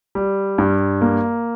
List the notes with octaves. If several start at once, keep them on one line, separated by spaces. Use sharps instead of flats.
G3
G2
A#3